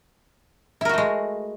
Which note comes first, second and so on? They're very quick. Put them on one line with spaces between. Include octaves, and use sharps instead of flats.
E4 A#4 F#4 A3 G#3